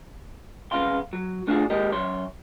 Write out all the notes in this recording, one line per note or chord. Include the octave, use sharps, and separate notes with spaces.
C2 F2 C#3 B3 F5 C6
F#3
A3 D4 F4 F#4 G#4
D#2 G#3 G4 A#4 D#5
F#2 C#5 C6